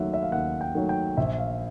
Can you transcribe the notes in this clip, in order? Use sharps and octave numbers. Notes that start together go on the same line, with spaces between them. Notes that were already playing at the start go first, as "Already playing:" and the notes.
Already playing: D#2 D#3 F#3 A3 E5 F#5
E5
F5
D#2 F#5
G5
D#3 F#3 A3
G5
A#1 E5
F5